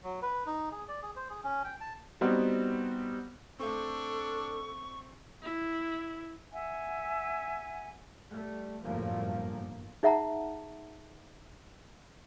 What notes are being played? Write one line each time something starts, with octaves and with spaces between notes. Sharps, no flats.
F#3
B4
D#4
G#4
D5
G#4
C5
G#4
C#4
G5
A5
G3 B3 C4 D#4 F#4
A3 C4 D4 A4 C#6
E4
E5 F#5 G#5
G3 A3
G1 F#2 A2 F3 A3 A#3
D#4 G#4 E5 F#5 A5 A#5